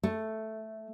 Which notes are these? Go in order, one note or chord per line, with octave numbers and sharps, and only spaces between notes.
A3